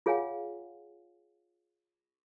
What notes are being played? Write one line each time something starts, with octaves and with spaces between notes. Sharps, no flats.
F4 G#4 C#5 F5 F#5 G#5